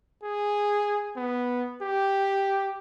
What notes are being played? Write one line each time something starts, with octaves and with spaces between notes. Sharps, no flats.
G#4
B3
G4